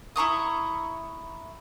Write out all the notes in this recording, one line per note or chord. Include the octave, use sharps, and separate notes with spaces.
E4 A#5 C#6 D#6